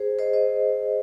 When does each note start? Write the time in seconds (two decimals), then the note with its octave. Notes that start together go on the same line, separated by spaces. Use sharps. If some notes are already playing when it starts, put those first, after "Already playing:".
Already playing: G#4 C5
0.19 C5 D#5
0.33 C5 D#5